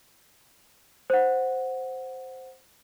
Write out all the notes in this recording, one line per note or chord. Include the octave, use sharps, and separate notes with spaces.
C5 F#5